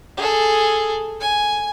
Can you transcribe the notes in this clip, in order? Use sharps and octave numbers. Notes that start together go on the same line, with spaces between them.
G#4 A4
G#5